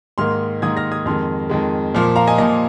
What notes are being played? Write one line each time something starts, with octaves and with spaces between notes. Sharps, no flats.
G#2 D#3 A#3 C6 F6
G#2 D#3 A#3 D#6 G#6
F6 A#6
D#6 G#6
F2 D#3 G#3 C6 F6
F2 D#3 G#3
A#2 F3 A#3 C6 F6
F5 A#5
D#5 G#5
A#2 F3 A#3 D#5